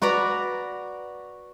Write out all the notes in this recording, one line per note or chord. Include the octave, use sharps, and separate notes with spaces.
F#4 B4 D5 A#5